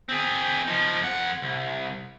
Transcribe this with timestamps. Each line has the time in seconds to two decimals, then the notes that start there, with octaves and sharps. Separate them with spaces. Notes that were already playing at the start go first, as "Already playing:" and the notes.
0.09 C4 G#4
0.67 F3 D#4
1.01 F2 F#5
1.42 C2